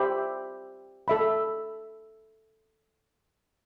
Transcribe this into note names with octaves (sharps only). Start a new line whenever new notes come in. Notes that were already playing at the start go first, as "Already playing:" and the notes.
Already playing: G4 C5 E5 B5
A4 E5 B5